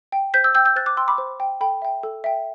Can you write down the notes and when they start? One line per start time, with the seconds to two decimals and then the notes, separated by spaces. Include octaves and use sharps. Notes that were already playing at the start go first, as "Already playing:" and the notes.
0.12 G5
0.34 C5 G6 B6
0.44 E6 G6
0.55 G5 E6 G6
0.65 E6 G6
0.76 C5 F#6 A6
0.86 D6 F#6
0.97 G5 C6 E6
1.08 B5 D6
1.18 C5
1.40 G5
1.61 A4 G5 B5
1.82 E5 G5
2.03 A4
2.24 E5 G5